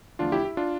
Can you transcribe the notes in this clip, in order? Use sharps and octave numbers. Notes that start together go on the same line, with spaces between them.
E2 D3 F3 A3 D4 F4
E4 G4
E4
D4 F4